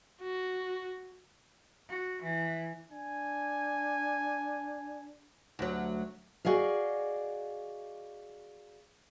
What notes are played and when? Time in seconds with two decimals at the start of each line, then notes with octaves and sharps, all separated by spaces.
0.22 F#4
1.89 F#4
2.23 E3
2.91 D4 G#5
5.59 D2 F#3
6.45 F#4 G#4 D5 D#5 F5